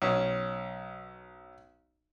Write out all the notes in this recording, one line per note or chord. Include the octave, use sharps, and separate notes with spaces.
B1 C#4